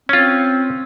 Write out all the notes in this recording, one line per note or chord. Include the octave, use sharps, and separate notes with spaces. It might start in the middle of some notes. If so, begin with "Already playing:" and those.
C4 C#4 F4